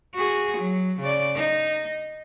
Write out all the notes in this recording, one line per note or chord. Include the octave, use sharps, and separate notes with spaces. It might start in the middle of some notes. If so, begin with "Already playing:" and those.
F#4 G#4
F#3
C#3 D5
D#4